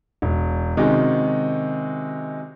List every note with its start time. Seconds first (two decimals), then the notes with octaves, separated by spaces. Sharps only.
0.22 E1
0.77 C3 D#3 G#3 C#4 D#4 F#4